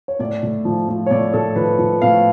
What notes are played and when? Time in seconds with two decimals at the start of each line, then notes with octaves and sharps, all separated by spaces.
0.08 C#5
0.19 A2 D5
0.43 A2
0.65 F3
0.89 F3
1.06 C#5
1.11 A2 D5
1.33 A2 A4
1.56 F3 B4
1.79 F3
2.02 A2 F5